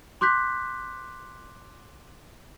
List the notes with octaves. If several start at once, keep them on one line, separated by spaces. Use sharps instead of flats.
C6 D6 F#6 G6 B6